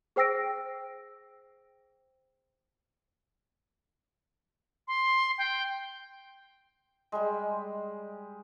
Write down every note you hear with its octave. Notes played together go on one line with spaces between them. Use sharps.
G#4 C5 G5 E6 A#6 D7
C6
G5
G3 G#3